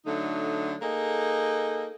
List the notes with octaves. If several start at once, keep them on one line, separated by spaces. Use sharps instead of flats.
D3 F#3 A3 D#4
A#3 D#4 G#4 A4